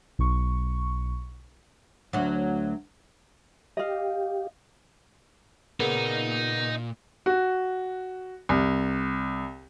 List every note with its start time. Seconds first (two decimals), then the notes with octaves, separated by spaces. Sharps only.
0.19 B1 C#6
2.13 D2 F#3
3.77 G4 D#5 F5
5.80 A#2 C#3 A#3 B3 D#4
7.26 F#4
8.49 C2